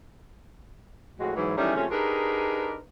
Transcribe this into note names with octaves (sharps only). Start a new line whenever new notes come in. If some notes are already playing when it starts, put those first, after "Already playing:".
F2 A2 G#3 F#4
G#2 E3 F#3
D#3 E3 F#3 G3 A3 C#4
C3 F3 G#3 A3 C#4
D4 D#4 G4 G#4 A#4 B4